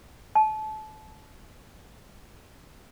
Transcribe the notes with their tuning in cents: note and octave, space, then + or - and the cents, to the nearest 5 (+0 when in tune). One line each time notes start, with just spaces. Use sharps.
A5 -25